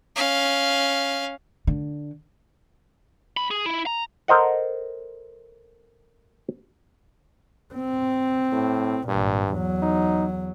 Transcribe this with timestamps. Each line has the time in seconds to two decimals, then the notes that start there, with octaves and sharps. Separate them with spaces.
0.16 C#4 F5
1.67 D3
3.37 C#2 B5
3.51 G#4
3.66 E4
3.86 A#5
4.28 A4 A#4 C5 D#5 F#5
7.75 C4
8.52 A2
9.08 G#1 G2 A#2
9.50 E2 F#3
9.83 D#4